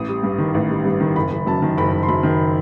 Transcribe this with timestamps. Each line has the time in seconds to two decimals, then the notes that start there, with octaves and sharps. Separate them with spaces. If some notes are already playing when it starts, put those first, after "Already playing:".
Already playing: A1 D#6
0.08 G3
0.23 G2
0.38 D#3
0.54 A1
0.70 G3
0.85 G2
1.00 D#3
1.16 F#1 B5
1.31 F#1
1.46 F#2 A5
1.62 D#3
1.78 F#1 B5
1.93 F#1
2.03 C6
2.08 F#2 B5
2.23 D#3